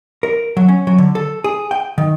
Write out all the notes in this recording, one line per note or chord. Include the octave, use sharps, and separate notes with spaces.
A#4
F#3
C#4
F#3
D3
A4
G#4
G5
D#3